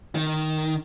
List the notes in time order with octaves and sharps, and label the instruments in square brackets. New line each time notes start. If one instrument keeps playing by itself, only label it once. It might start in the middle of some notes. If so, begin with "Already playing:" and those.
[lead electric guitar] D#3